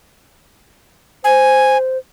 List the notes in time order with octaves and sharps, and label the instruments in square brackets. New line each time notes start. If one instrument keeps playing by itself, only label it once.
[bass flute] C5 [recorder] G#5